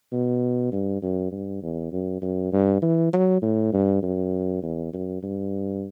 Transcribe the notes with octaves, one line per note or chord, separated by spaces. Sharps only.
B2
G2
F#2
G2
E2
F#2
F#2
G2
E3
F#3
A2
G2
F#2
E2
F#2
G2